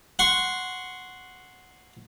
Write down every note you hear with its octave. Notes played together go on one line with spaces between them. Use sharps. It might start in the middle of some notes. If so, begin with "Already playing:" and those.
F#5 C6 C#6